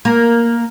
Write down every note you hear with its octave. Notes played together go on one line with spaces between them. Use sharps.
A#3